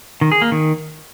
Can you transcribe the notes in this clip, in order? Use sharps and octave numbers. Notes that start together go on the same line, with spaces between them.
D#3
G#4
A#3
D#3